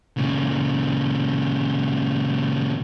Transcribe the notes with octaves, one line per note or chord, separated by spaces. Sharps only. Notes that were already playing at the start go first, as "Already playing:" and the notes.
A#2 C#3